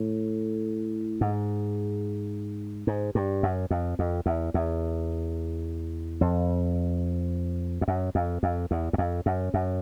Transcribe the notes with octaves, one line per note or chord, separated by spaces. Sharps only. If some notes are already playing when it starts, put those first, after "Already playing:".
Already playing: A2
G#2
G#2
G2
F#2
F2
F2
E2
E2
F2
F2
F#2
F2
F2
E2
E2
F2
F#2
F#2